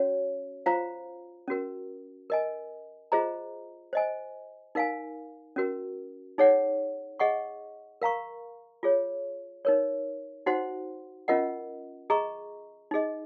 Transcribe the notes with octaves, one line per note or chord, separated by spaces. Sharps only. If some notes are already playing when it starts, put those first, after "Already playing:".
Already playing: C#4 F#4 C#5
F4 C5 F5 A#5
C#4 F#4 A#4
A#4 D#5 G#5
F4 G#4 C5 D#5 A#5
C5 D#5 G#5
D#4 A#4 F5 G#5
C#4 F#4 A#4
D#4 G#4 C#5 F#5
G#4 D#5 F#5 C#6
A#4 F5 A#5 C#6
F4 G#4 C#5
D#4 A#4 C#5
D#4 F#4 C5 F#5 C6
C#4 F4 A#4 D#5 F#5
G#4 D#5 A#5 C#6
D#4 G#4 D#5